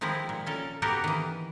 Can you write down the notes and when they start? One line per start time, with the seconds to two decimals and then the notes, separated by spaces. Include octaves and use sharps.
0.01 D#3 F3 G#3 C4 E4
0.29 A#2
0.46 C#4 A4 A#4
0.82 A#3 B3 F#4 G4 A4 A#4
1.04 D#3 E3